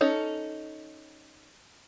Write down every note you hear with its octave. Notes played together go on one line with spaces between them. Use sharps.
C#4 D#4 A4